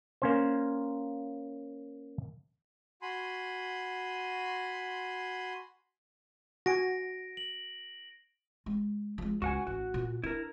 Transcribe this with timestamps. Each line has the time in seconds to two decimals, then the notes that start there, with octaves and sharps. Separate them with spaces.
0.22 A#3 C#4 C5
3.02 F#4 G#5 B5 C6
6.66 F#4 G#5 A#6 D7
7.37 F#7
8.66 G#3
9.18 F3 G#3
9.42 C#2 F#4 F#5 G#5
9.67 A1 F#4
9.94 A#2
10.24 D4 E4 A#4